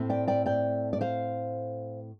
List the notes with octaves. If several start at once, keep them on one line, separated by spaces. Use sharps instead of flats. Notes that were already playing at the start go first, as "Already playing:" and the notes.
Already playing: A2 A3 C4
D5 G5
D5 G5
D5 G5
D5
C5 F5